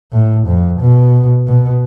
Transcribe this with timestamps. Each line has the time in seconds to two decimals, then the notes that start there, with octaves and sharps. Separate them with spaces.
0.12 A2
0.47 F2
0.80 B2
1.46 B2